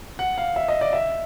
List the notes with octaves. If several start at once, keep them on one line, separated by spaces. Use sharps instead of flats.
F#5
F5
E5
D#5
D5
E5